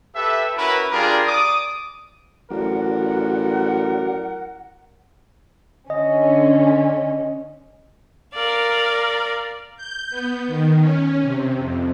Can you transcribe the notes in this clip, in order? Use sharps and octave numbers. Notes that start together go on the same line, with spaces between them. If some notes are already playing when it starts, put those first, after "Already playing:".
G4 A4 B4 E5
C#4 E4 F#4 A#4 B4
G3 D4 F4 G#4 A#4
D5 D6 D#6
A1 F#3 F#4 A#4 D5 F#5
D3 C#4 D#5
A#4 D5 F5
G6
B3
D#3
C#4
C3
F2